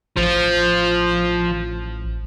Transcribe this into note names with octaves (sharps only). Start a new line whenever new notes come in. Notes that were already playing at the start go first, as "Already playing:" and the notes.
A1 F3